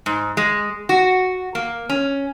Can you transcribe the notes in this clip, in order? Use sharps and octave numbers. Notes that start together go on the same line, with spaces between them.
G#2
G#3
F#4
A#3
C#4